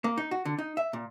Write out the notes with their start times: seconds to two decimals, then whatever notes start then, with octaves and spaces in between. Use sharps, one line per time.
0.04 A#3
0.17 D#4
0.31 F#4
0.45 D3
0.58 D#4
0.77 E5
0.93 A#2